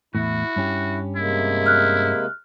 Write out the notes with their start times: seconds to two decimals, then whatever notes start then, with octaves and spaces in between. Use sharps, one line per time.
0.15 E2 A2 E4 F#4
0.56 G2 C#4 G4
1.16 C3 G#3 A#3 E4
1.66 F6 F#6